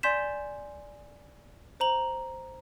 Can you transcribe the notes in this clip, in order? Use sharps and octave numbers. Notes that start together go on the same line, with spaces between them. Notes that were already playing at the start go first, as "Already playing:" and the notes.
D5 G#5 C6 G6 B6 E7
C5 A#5 F#7